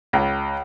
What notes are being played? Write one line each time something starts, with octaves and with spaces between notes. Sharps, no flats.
C#2